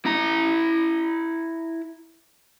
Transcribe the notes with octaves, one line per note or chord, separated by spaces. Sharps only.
E4 A#5